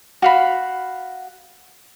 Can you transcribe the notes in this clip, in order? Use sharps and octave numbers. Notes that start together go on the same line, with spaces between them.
F#4 F5 B5